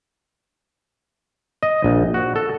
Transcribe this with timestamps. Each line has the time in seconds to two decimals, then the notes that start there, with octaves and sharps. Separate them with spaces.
1.63 D#5
1.84 A#1
2.14 F#4
2.36 A4